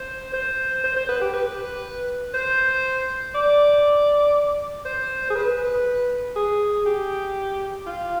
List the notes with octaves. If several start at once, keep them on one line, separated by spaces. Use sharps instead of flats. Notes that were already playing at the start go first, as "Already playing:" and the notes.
Already playing: C5
C5
C5
C5
B4
G4
B4
C5
D5
C5
G#4
B4
G#4
G4
F4